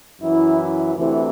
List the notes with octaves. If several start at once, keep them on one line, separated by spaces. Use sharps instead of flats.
F#2 E3 E4
D2 C3 E3